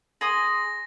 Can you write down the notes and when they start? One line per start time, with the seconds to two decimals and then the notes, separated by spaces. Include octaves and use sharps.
0.21 G#4 C6 D#6 A#6